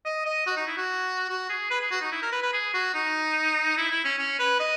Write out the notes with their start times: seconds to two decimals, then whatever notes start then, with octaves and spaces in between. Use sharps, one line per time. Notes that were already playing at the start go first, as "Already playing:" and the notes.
0.05 D#5
0.26 D#5
0.46 F#4
0.57 D#4
0.67 E4
0.77 F#4
1.29 F#4
1.49 G#4
1.70 B4
1.81 G#4
1.91 F#4
2.02 D#4
2.12 E4
2.22 A#4
2.32 B4
2.43 B4
2.53 G#4
2.74 F#4
2.94 D#4
3.77 E4
3.91 E4
4.05 C#4
4.18 C#4
4.39 B4
4.60 D#5